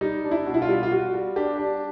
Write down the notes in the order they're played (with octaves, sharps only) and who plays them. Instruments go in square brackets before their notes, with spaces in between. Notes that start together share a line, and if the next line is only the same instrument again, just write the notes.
[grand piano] G3 D#4
D4
E4
B2
E4
F4
G3
F4
G3 F#4
G3
D4 G4
D4